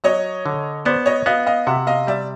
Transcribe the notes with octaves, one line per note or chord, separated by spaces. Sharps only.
F#3 C#5 D#5
D3
B3 C5 D5
C#5 D#5
B3 D#5 F5
D#5 F5
C3 E5 F#5
D#5 F5
G3 D5 E5